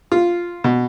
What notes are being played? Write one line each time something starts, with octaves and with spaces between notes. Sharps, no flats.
F4
B2